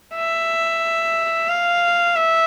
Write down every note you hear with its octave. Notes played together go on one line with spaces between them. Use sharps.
E5
F5
E5